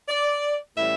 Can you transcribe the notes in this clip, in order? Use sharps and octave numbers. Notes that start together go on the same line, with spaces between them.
D5
A2 E3 G3 C#4 E5